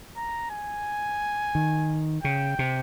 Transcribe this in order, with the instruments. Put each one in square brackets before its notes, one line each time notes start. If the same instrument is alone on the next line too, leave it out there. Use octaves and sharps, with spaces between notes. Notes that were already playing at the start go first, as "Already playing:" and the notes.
[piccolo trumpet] A#5
G#5
[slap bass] D#3
[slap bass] C#3 [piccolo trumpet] G5
[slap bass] C3